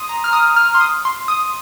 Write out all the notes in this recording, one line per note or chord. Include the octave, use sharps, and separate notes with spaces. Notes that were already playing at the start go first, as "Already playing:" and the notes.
Already playing: C6 D#6
A#5
F6
D#6
F6
C6
D#6
C6
D#6